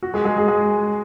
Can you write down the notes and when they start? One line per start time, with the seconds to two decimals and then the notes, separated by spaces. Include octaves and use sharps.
0.03 F#4
0.14 G#3 G#4
0.25 G#3 G#4
0.37 G#3 G#4
0.48 G#3 G#4